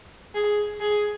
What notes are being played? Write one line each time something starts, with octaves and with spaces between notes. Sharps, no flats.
G#4
G#4